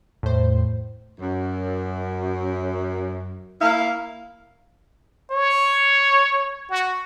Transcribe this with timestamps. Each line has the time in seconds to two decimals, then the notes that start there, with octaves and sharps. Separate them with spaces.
0.23 E2 A2 C5
1.21 F#2
3.61 A#3 E4 F5
5.31 C#5
6.70 F#4